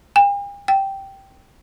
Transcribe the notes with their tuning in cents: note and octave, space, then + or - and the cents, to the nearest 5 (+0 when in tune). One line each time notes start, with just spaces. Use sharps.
G5 +45
G5 -5